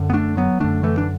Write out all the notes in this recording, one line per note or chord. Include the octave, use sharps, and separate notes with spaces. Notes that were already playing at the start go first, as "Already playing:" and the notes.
Already playing: F#2 D3
B3
A3 D4
F#3 B3
F#2 D3 A3 D4
E3 A3
D4